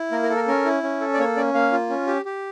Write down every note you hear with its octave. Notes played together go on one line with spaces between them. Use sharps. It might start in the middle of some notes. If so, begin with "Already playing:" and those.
Already playing: E4
A#3 A#4
A#4
A4
A#4
C#4 A#4
E4
C#4
A4
D5
A#3 C#5
C#4 D5
A#3 F5
F4
C#4
G4
G4